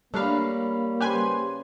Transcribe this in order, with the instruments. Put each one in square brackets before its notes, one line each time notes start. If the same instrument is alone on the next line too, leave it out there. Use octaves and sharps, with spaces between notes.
[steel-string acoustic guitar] G3 [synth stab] A3 D4 F5 [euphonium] A#3 [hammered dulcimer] C#5 A#5 B5
[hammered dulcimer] C#3 C5 [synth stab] G4 B4 G#5